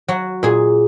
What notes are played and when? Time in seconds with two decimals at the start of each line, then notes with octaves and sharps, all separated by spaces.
0.08 F#3 F#4
0.43 A#2 G#4